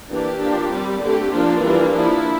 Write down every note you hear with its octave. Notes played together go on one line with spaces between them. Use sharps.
E3 A#3 D4 G4
F3 A#3 D4
G3 C4
D3 A3 C4 G4
F3 A#3 D4 F4
E3 G3 A#3 D4
F3 A#3 D4 E4